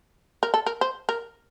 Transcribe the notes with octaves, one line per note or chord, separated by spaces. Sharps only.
A#4
A4
A#4
C5
A#4